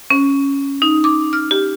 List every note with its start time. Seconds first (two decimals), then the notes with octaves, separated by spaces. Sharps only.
0.10 C#4
0.82 D#4
1.04 D6
1.33 F6
1.51 G4